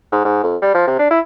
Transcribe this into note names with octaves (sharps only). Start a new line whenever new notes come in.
G#2
G#2
F2
G3
F3
C3
D4
E4